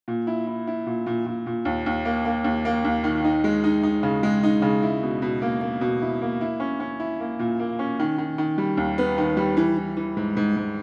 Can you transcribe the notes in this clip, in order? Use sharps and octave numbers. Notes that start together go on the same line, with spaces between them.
A#2
E4
E4
E4
A#2
A#2
A#2
A#2
D#2
D#2
A#3
A#3
D#2
A#3
D#2
D#3
D#4
G#3
D#4
D#4
C#3
G#3
D#4
C#3
E4
B2
B2
A#3
A#3
B2
E4
A#3
E4
C#4
C#4
E4
A#3
A#2
A#3
C#4
D#3
D#3
D#3
G3
D#2
B3
D#3
G3
E3
E3
E3
G#2
G#2
G#2